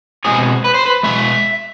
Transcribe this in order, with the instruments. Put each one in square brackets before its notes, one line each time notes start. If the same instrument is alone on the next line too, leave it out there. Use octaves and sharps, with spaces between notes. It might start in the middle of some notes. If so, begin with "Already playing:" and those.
[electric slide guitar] B2 G#3 C4 G#4
B4
C5
B4
B2 G#3 E5